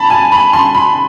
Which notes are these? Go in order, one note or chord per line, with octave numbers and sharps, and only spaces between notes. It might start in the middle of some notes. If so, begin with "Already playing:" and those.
Already playing: A5 B5
G#5
B5
C6
B5